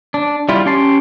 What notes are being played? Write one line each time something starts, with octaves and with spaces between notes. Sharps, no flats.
D4
G3 E4 F4
C#4 G4 A5 C6